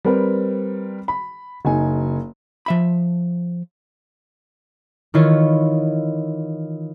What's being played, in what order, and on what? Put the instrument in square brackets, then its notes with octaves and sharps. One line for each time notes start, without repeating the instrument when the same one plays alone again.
[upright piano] G3 C4 A#4 B4
B5
F#1 D#4 G#5
[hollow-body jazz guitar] F3 E5 B5
[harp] D#3 E3 E4 F4 C#5